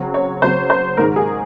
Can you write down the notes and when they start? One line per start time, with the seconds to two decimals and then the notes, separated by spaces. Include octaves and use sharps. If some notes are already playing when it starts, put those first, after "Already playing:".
Already playing: C#3 F#3 C4
0.14 C#5
0.42 C#3 F#3 C4 C5
0.70 C5
0.97 G#2 D#3 G#3 A#4
1.16 G#4